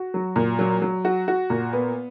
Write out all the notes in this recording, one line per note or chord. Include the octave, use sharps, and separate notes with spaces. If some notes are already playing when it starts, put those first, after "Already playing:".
Already playing: F#4
F#3
A#2
F#3
F#3
F#4
F#4
A#2
B3